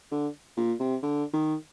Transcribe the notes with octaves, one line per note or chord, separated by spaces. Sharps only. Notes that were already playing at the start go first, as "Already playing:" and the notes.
D3
A#2
C3
D3
D#3